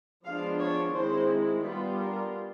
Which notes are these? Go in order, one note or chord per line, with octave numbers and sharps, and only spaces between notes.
F3 G#3 B3 D4 F4 F5
C#5
D#3 G#3 C4 E4 C5
G3 B3 D4 F4 B4
A#4